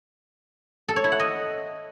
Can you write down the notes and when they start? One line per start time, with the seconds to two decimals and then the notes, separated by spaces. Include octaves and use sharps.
0.88 A4
0.96 C#5
1.04 E4
1.12 F#5
1.20 D#5